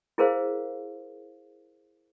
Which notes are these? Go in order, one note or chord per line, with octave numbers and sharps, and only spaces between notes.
E4 G#4 A#4 C5 F5